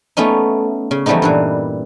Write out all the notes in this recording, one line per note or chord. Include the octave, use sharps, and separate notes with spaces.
A3 B3 C#4 D#4
C#3
E3 F3 G3 A3 B3 D#4
G2 A#2 E3